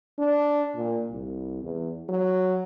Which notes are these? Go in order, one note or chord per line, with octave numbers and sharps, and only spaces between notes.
D4
A#2
C2
E2
F#3